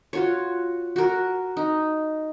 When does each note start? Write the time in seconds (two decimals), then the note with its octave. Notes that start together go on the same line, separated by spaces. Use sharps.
0.13 F4 F#4 C#5
0.96 F#4 A#4
1.57 D#4